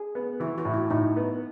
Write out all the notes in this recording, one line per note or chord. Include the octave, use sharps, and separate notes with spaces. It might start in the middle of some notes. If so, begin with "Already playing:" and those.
Already playing: G#4
B3
E3 F#4
F#4
A2
E4
A2 D#4
B3